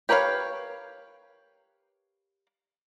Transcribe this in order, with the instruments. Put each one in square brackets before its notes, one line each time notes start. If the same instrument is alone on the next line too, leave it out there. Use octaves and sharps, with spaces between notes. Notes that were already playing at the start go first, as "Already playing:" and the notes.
[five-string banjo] G4 A#4 B4 C#5 F5